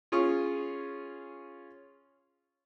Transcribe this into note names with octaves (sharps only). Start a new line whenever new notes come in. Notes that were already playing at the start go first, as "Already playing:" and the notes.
C#4 F4 G#4 C#6